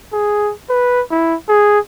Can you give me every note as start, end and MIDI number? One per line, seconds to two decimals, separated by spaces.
0.13 0.52 68
0.69 1.01 71
1.11 1.35 64
1.48 1.79 68